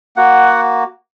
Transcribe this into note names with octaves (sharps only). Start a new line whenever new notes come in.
A#3 F#4 F#5